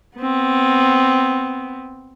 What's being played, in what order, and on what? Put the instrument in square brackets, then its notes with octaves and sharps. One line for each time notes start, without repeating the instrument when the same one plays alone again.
[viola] B3 C4